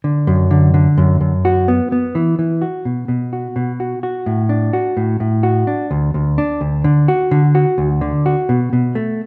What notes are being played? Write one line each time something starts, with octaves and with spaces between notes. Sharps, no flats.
D3
F#2
D3
D3
F#2
F#2
F#4
B3
B3
E3
E3
F#4
B2
B2
F#4
B2
F#4
F#4
A2
D4
F#4
A2
A2
F#4
D4
D2
D2
D4
D2
D3
F#4
D3
F#4
D2
D3
F#4
B2
B2
A3